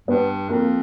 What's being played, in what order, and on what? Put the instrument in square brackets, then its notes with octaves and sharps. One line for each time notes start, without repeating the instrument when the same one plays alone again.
[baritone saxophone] G2 [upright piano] B3
[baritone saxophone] F2 [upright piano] A#3